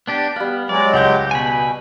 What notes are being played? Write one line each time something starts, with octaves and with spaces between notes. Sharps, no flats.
B3 D4 G4
G3 B3 F5
F#3 G#3 D5
C#2 G4 F#5 G6
B2 G#5 B5